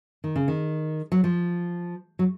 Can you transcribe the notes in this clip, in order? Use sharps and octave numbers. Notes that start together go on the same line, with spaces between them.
D#3
C#3
D#3
F#3
F3
F#3